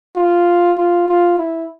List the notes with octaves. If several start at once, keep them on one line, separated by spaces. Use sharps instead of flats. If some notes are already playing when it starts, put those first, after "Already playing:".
F4
F4
F4
E4